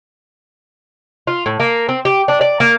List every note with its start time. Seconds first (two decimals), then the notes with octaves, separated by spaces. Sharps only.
1.27 F4
1.46 A2
1.60 A#3
1.89 C4
2.05 G4
2.28 D4
2.41 D5
2.60 A#3